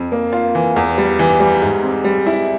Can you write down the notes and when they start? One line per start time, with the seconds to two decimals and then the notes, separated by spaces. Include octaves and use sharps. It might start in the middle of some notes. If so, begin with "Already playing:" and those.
Already playing: F2
0.12 A#3
0.33 F4
0.55 E3
0.76 E2
0.98 G3
1.19 E3
1.40 G3
1.62 G#2
1.83 C4
2.04 G3
2.27 E4